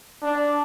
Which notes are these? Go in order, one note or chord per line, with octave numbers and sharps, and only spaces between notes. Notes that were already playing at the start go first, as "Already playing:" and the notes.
D4